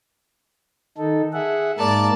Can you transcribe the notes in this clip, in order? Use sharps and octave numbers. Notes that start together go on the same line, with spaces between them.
D#3 D#4 A4
G#4 E5 F#5
G#2 A#3 A#4 D5 A5